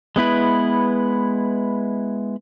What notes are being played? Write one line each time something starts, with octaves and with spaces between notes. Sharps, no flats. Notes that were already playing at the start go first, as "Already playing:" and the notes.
G#3 B3 E4 B4